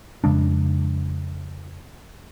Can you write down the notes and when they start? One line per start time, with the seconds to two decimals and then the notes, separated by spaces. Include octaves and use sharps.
0.24 F2 C#3 G#3 D4